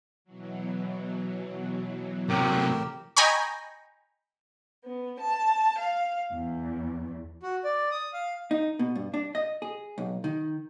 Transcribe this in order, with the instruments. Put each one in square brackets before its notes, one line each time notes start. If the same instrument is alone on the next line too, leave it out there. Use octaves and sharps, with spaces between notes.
[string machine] B2 E3 F#3
[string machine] A2 E6 [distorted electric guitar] C3 F#3 [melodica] G4 A#4
[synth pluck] D#5 G5 G#5 A#5 B5 C#6
[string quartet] B3
A5
F5
E2
[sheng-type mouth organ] F#4
D5
D#6
F5
[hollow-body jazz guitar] D#4
B2
G2
D4
D#5
G#4
B1
D#3